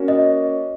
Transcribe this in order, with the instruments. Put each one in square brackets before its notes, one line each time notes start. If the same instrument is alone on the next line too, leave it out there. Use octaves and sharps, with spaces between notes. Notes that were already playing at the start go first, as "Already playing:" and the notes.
Already playing: [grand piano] A#3 C#4 F#4
[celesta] D#5